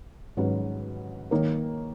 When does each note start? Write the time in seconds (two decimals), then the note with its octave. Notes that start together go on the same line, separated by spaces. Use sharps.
0.37 G#2 F#3 C#4 F#4 B4
1.31 D#3 A#3 D#4 A#4 C#5